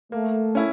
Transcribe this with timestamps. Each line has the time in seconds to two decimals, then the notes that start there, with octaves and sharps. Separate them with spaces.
0.12 A3 A#3
0.55 C#4 E4